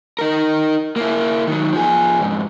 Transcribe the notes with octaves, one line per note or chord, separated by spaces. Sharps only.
D#4 A#4
A#3 E4
D#3 F#3
F3 G#4
F2 G#2